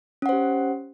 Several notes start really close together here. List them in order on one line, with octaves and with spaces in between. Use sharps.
C#4 F#5 C5 G4